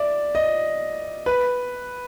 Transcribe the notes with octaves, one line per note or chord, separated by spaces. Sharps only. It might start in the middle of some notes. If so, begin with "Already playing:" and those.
Already playing: D5 E5
D#5
B4